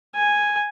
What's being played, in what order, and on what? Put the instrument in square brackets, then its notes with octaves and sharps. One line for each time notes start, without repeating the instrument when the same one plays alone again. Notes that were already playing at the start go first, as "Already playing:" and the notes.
[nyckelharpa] G#5